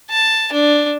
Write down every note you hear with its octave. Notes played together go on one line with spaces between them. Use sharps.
A5
D4